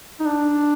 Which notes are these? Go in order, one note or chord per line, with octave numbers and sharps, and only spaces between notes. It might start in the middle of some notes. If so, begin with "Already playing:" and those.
D#4
D4